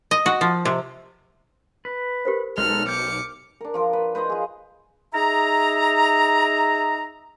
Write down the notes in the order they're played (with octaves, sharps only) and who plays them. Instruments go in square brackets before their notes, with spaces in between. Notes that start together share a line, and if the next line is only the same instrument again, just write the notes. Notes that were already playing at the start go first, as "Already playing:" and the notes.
[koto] D#5
F#4
F3
C3
[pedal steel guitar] B4
[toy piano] G4 A#4 C5
[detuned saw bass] B1 [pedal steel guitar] G#3 D#4 A4 [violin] F6
[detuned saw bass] B1 [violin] D6 C#7 [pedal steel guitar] F6 G6
[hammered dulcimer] D4 A#4
F3 F4 A#4
B4
B4 C5 D#5 A#5
F4 G#4
[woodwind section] D#4 G#4 E5 A#5